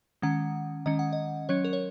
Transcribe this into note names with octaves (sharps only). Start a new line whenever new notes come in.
D#3 G#3 C#4 F#5
D#3 G#3 C#4 D#5
F#5
D#5
F#3 C#4 C#5
A#4
C#5